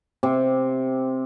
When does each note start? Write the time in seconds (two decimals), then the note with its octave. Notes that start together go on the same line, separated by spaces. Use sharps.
0.23 C3